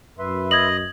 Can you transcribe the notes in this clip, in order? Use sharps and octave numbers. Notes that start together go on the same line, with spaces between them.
F#2 B4 E5 C6
D#5 G#6 F#7